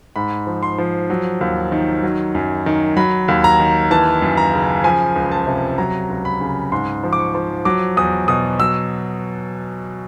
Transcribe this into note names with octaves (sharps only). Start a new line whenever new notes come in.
G#2 B5
F3
C6
F3
F#3
D#2
D#3
F#3
F#2
D#3
F#3 B5
D#2
A#5
D#3
E3 A5
F#2
A#5
C#3
F3 G#5
C#2
A5
C3
F#3 A#5
C#2
B5
C#3
G#2 C6
F3
D6
C#6
F3
F#3 D6
E2 D#6
B2 D#6
F#3 E6